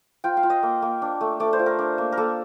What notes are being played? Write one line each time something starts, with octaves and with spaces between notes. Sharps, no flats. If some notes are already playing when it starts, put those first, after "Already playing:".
F4 G5
F5
F4
D#5
A#3
A#3
D4
A3
A3 D5
C5
F4
A#4
D4
A#3
A#4
A#3 A4